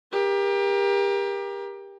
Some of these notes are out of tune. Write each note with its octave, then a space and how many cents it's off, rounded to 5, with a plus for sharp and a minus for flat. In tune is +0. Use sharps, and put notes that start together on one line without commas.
G4 +25 A#4 +25